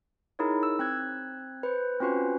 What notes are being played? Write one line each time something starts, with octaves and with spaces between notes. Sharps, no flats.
D#4 E4 G#4 A#4 C#5
E6
C4 F#6 G#6
B4 C5
C4 C#4 F4 F#4 B4 C5